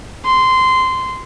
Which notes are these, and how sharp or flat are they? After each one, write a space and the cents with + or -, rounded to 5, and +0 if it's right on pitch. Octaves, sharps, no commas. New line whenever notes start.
C6 -15